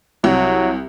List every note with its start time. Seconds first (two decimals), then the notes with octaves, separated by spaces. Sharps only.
0.24 C2 F#3